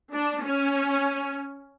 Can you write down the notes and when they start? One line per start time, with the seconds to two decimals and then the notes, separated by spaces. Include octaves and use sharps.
0.13 D4
0.44 C#4